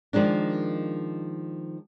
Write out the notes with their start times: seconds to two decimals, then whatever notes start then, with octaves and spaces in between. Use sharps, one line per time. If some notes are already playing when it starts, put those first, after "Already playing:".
0.13 D#3 F3 G#3 A#3 D4